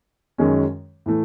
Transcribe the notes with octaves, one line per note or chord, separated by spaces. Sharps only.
F#2 D#3 G#3 C#4
A2 E3 A3